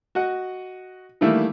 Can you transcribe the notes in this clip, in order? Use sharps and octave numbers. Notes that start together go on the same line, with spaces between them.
F#4 D#5 F#5
D#3 E3 G3 A3 A#3 E4